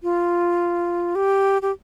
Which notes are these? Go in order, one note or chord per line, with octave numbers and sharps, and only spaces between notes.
F4
G4
G4